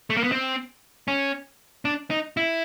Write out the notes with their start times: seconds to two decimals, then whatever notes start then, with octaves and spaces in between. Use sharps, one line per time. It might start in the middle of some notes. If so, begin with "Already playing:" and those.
0.10 A3
0.17 A#3
0.24 B3
0.32 C4
1.08 C#4
1.85 D4
2.10 D#4
2.37 E4